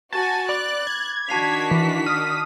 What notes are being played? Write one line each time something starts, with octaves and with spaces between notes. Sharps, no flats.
F#4 G#5 A5 A6
D5 B5 D6 F#6
G#6
D#3 D4 F#4 A5 B6 C7 F7
E3
D#6 F6